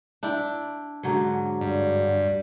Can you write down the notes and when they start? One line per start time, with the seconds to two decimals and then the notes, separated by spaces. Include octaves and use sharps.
0.23 D4 E4 G5
1.03 G#2 D3 F#3
1.61 G2 D5